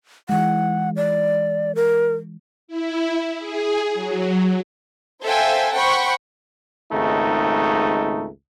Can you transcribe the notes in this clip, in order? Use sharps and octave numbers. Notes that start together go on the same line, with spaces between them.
E3 G#3 F#5
D5
A#4
E4
G#4
F#3
A4 C5 E5 F5 G5 G#5
C5 F#5 G5 B5 C#6
G#1 C#2 A3 D#4